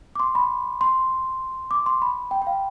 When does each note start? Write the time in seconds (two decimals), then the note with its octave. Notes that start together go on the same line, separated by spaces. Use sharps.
0.16 D6
0.20 C6
0.35 B5
0.81 C6
1.71 D6
1.86 C6
2.02 B5
2.31 G5
2.42 G5
2.47 F5